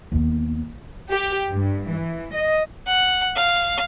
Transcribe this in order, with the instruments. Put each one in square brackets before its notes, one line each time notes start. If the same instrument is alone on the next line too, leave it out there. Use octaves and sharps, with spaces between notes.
[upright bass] D#2 B3
[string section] G4
G2
E3
D#5
[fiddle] F#5
F5